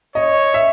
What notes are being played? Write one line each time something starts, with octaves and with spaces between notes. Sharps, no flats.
C#5 D#5
E5